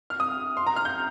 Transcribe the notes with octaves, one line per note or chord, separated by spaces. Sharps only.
F6
D#6
C6
A#5
F6
G6